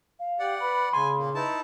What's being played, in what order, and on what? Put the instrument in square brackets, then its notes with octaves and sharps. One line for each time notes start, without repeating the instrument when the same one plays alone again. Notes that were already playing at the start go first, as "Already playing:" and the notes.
[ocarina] F5
[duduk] G4 [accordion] D5 F#5
[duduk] B4 [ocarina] B5
[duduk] C#3 [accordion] G#5 [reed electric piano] C6
[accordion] A#2 A#3
[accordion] D#4 E4 A5 [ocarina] B4